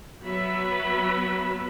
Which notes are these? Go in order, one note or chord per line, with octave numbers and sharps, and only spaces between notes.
F#3 B3 F#4 B4 E5 B5